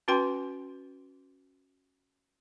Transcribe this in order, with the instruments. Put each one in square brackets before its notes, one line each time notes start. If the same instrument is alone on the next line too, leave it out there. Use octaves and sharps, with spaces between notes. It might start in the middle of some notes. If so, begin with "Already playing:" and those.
[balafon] C#4 F#4 B4 G5 C6